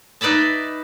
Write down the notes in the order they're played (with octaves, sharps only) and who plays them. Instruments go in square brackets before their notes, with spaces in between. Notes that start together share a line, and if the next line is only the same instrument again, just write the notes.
[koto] D#4 B4 D5 E5 A5